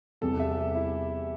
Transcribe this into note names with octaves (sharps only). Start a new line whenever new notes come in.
E2 C3 G3 A4
E5
G4
E4